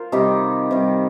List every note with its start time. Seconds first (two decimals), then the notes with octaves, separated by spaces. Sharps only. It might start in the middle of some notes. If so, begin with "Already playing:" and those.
Already playing: F4 A#4 C5
0.12 C3 D#3 G3 D#4 G4
0.71 C3 D#3 G3